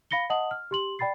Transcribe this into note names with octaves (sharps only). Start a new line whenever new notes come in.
F5 B5 A#6 C#7 G7
D#5 F#5 A5 D#6 F#7
F6
G4 C6 F#7
D5 G5 B5 A6 C7